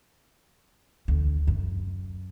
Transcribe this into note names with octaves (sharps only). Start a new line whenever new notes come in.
D2
F#2